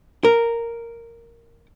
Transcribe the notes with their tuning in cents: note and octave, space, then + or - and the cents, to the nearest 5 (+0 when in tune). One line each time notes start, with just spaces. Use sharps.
A#4 -5